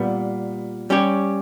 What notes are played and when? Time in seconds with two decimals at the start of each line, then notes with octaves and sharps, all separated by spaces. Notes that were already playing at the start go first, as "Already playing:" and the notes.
Already playing: A#2 G3 B3
0.90 G3 C#4 G4 C#5